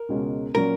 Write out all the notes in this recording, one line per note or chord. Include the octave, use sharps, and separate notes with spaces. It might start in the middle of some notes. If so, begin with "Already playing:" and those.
Already playing: A#4
C#2 B2 G#3 C#4
A#2 F#3 C#4 A#4